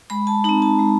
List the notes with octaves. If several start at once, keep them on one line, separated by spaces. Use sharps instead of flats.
G#3 B5
A5
C4 D#4 A#5
A5
G#3